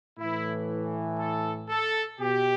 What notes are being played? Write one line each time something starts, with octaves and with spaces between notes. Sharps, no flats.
A2 E3 E4
A4
A4
B2 G4